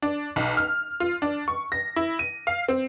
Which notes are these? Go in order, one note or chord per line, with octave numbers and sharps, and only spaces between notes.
D4
B1
F6
F4
D4
C#6
A#6
E4
D#7
F5
C4